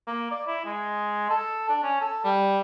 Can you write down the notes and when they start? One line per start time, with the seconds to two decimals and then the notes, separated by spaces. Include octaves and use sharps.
0.07 A#3
0.31 D5
0.47 E4
0.66 G#3
1.30 A4
1.69 D4
1.83 C#4
2.01 A4
2.24 G3